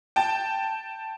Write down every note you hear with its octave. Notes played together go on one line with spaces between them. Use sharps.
G5 A5